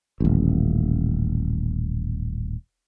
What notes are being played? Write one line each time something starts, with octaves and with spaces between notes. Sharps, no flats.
D#1 A1